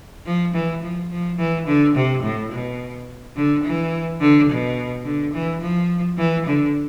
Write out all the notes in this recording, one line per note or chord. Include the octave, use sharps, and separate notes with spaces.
F3
E3
F3
F3
E3
D3
C3
A2
B2
D3
E3
D3
B2
D3
E3
F3
E3
D3